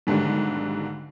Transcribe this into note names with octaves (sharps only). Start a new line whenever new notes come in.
B1 G#2 D3 D#3 G3